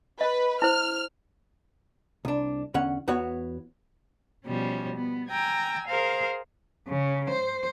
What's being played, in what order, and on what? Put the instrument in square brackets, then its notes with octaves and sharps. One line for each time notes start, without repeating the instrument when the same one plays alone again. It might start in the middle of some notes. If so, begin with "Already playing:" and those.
[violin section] B4 [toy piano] D#5
[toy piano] E4 C5 [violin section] F6
[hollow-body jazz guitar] C2 D4
E2 D3 C#4 F#5
E2 B3 F#4 C#5
[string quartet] B2 F3 G3 C#4
B3
G5 G#5 A#5 E6
G#4 A#4 C5 F5
[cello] C#3
C5